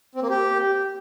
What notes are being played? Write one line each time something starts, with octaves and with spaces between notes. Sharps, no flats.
C4
A#3
G4